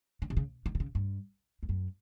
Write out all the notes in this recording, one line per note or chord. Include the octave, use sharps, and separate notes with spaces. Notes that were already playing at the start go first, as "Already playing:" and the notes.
D3
C3
C#3
D#3
C3
C#3
G2
F2
F#2